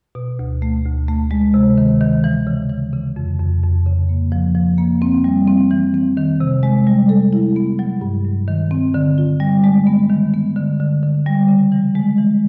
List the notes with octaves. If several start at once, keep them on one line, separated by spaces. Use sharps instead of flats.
B2
D2
A3
D2
A3
G#3
C3
D#3
D#3
E3
C#3
E3
C#3
F2
F2
F2
C#3
A#3
F3
F3
A#3
C4
G3
C4
E3
C4
D#3
C3
G#3
G3
A4
E4
B3
F#3
G2
G2
D#3
C4
D3
F4
G3
G#3
B3
D#3
B3
D3
D3
D3
G3
C#3
E3
G#3
E3